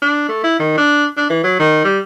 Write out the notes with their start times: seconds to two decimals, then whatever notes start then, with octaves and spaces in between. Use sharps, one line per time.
0.02 D4
0.29 A3
0.44 E4
0.59 D#3
0.77 D4
1.17 D4
1.30 E3
1.44 F#3
1.59 D#3
1.84 G3